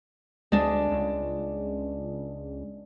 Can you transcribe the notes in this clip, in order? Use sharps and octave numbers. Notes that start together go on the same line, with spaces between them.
D2 G#3 D4
C#2